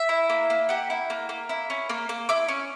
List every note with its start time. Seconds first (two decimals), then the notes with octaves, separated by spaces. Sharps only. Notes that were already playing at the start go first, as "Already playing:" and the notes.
Already playing: E5
0.09 E4
0.29 A#3
0.50 A#3
0.69 G4 F#5
0.90 E4
1.10 A#3
1.29 A#3
1.49 E4
1.70 C#4
1.89 A#3
2.09 A#3
2.29 E4 D6
2.48 C#4